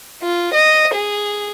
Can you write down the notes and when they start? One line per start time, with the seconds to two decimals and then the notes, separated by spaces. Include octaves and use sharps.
0.22 F4
0.54 D#5
0.94 G#4